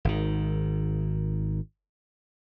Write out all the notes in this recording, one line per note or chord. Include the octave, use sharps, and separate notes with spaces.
G#1 D#3